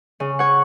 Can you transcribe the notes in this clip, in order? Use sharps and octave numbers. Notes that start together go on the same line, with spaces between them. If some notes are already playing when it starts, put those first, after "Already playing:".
C#3
C#5 F#5